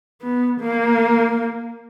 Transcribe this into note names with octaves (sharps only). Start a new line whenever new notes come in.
B3
A#3